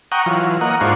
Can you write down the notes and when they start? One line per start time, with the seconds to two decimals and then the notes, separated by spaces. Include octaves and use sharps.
0.12 F#5 G5 A#5 C#6 D#6
0.26 E3 F#3 F4
0.61 A#3 A#4 D#5 F#5
0.81 G#2 D4 F4 F#4 C5 C#6